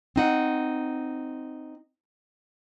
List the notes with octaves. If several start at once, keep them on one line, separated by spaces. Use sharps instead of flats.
C4 D#4 F#5